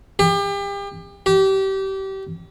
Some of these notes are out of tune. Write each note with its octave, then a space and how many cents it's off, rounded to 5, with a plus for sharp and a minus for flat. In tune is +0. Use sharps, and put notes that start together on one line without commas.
G4 +35
G4 -25